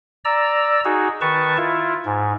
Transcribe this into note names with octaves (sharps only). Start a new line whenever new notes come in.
D5 A#5 E6
D#4 F#4 G#4
D#3 B4 A5 C#6
E4 F4
G#2